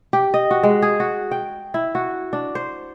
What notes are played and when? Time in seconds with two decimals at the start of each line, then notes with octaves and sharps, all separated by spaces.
0.13 G4
0.34 D#5
0.51 F#4
0.63 G#3
0.82 G#4
1.00 F#4
1.31 G5
1.74 E4
1.95 F#4
2.33 D4
2.55 C5